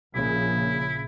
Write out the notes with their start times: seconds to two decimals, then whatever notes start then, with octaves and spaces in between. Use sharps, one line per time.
0.15 A#1 A#2 C#3 E4